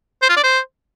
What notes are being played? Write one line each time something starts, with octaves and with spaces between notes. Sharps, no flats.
C5
F4
D5
C5